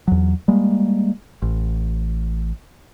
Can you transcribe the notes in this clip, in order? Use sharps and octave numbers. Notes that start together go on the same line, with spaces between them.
E2 F#3
G3 G#3 A#3
A1